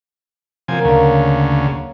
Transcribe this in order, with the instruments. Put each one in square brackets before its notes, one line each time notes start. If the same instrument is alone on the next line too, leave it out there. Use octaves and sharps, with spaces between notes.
[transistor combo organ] C3 F3 G#5 [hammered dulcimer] F#3 A#3
[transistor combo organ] D2 C#3